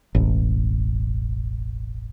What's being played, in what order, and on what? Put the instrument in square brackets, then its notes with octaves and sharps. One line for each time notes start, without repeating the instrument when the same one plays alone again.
[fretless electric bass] E1 A1